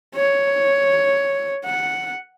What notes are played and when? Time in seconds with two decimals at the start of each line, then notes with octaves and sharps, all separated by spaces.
0.16 C#5
1.65 F#5